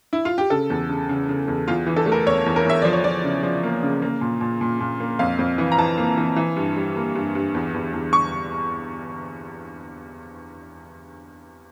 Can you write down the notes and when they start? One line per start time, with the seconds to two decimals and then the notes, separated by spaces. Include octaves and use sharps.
0.13 E4
0.25 F4
0.38 G4
0.50 C#3 A4
0.70 E2
0.89 C#3
1.09 C#3
1.29 C#3
1.48 E2
1.68 E2 F4
1.86 E3
1.96 A4
2.06 A3
2.12 A#4
2.26 E2 C#5
2.46 E2
2.56 A#4
2.65 E2 E5
2.82 F3 D5
2.93 C#5
3.04 F3 D5
3.24 C#3
3.43 F3
3.63 A#3
3.83 C#3
4.02 A#3
4.21 A#2
4.41 A#2
4.61 A#2
4.80 A#2
5.00 A#3
5.19 F2 F5
5.39 F2
5.58 E3
5.72 A#5
5.78 E3 A5
5.98 A#3
6.18 E3
6.36 E3
6.56 G2
6.76 G3
6.96 A#3
7.15 G2
7.35 G2
7.54 E2
7.74 E2
7.94 E2
8.13 C#6